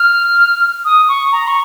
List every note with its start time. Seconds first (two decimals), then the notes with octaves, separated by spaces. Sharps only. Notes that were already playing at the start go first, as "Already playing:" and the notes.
Already playing: F6
0.85 D#6
1.08 C#6
1.32 A#5
1.47 C#6